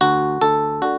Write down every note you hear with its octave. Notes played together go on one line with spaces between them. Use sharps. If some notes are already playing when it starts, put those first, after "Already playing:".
D2 F#4
D2 A4
D3 F#4